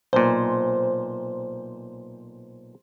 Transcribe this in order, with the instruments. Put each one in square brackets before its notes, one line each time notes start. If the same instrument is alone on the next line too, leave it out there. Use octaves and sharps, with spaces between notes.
[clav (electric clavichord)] B1 A#2 [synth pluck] C5